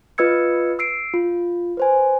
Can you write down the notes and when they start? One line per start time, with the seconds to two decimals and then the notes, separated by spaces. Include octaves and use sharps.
0.18 F4 B4 D#5 E6 G#6 C#7
0.79 E6 C7 D7
1.14 F4
1.77 B4 C5 G#5